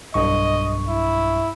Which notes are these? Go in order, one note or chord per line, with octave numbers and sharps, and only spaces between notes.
B1 G2 D#5 C#6
E4